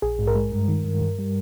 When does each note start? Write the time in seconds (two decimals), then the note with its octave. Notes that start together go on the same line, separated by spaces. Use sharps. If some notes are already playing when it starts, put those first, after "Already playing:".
0.02 A#1 G#4
0.19 G#2
0.27 A#4
0.36 G#3
0.52 G2
0.68 D#3
0.84 G2
1.01 G2
1.19 G3